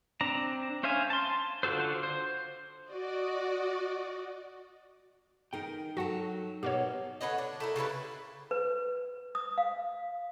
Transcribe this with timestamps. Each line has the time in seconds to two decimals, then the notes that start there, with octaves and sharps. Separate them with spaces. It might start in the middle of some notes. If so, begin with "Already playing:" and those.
0.21 C4 D4 A#5
0.83 C#4 C5 E5 F5 G#5
1.10 A5 C6
1.63 D3 F4 F#4 A4 C5
2.03 C5
2.90 F#4 D5 D#5
5.53 D#4 G#4 A#4 G5
5.97 F#3 F#4 A4 F#5
6.63 B2 G4 A#4 C#5
7.21 D3 B4 C#5 D#5
7.38 D4
7.60 A3 E4 A#4
7.76 C#3 G3 E4 B4
8.51 B4
9.35 D#6
9.58 F5